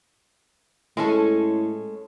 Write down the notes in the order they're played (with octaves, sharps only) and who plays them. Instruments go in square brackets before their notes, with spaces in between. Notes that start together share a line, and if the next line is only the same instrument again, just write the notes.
[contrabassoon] A2 [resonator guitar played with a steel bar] G#3 C#4 A4